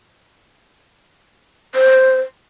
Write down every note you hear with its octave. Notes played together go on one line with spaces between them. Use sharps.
C5